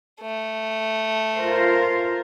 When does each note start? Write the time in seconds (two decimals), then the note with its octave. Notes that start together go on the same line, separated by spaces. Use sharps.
0.22 A3
1.39 F4 A#4 C5